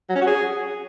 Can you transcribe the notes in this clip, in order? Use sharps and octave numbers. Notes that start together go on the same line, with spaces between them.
F#3
C#4
F#4
G#4